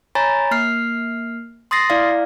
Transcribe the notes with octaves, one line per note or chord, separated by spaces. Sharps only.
C#5 G#5 A#5 B5 A6
A#3 F6 C7
C6 D#6 A6 A#6 C7
E4 D5 F5